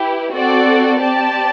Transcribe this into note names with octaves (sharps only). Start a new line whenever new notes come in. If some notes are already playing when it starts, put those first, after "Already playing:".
Already playing: E4 G4 B4
C4 F#4 A4 D5
C4 G4 D5 A5